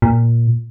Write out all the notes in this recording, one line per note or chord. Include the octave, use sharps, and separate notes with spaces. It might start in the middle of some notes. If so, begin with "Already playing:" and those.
A#2